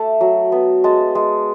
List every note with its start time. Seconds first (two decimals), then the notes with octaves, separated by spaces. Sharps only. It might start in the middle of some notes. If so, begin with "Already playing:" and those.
Already playing: A3 A5
0.21 F#3
0.52 B3
0.84 G#3 A5
1.15 G#3